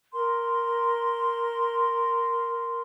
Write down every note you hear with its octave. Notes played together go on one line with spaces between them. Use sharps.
A#4 C6